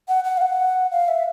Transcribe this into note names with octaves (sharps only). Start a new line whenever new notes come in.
F#5
F#5
F5
F#5
F5
E5